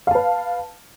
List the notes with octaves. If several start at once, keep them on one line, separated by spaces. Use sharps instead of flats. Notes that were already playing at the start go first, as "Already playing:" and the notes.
B4 F5 A5